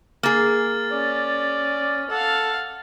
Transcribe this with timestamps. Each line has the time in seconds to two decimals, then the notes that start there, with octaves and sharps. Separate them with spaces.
0.23 A#3 G#4 F6 A6
0.92 C#4 D5
2.11 A4 F5 F#5